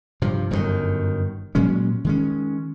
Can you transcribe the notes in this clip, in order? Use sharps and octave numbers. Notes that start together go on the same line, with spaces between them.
G2 C3 F3
G1 F#2 B2 D#3
A#2 F#3 G#3 C#4
D#3 G#3 C#4